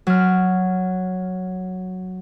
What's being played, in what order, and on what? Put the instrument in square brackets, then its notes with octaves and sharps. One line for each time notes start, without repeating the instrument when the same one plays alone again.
[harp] F#3 F6